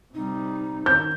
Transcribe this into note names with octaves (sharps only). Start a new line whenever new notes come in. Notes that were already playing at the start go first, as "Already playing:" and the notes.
C3 G3 D#4
D#3 G6